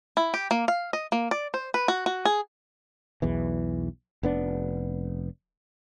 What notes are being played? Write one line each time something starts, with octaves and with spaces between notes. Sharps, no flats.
E4
G4
A#3
F5
D#5
A#3
D5
C5
B4
F#4
F#4
G#4
B1 E2 E3
F1 B3 D4